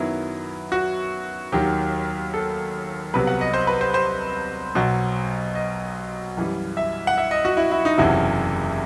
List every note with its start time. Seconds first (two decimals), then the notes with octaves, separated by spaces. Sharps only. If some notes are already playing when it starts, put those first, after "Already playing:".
Already playing: F#2 D#3 F#3 B3 E4
0.72 F#4
1.52 D#2 D#3 F#3 G4
2.34 A4
3.13 C2 C3 F#3 B3 B4
3.27 F#5
3.41 D#5
3.54 C5
3.67 B4
3.81 C5
3.94 C5
4.75 B1 B2 F#3
5.55 D#5
6.37 F#2 E3 G3
6.77 E5
7.07 F#5
7.18 E5
7.31 D#5
7.45 F#4
7.57 E4
7.71 E4
7.85 D#4
7.98 F#1 E2 C3 F#3 E4